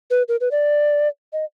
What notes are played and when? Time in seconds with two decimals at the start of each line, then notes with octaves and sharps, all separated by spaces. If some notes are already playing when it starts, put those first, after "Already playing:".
0.11 B4
0.28 A#4
0.41 B4
0.51 D5
1.33 D#5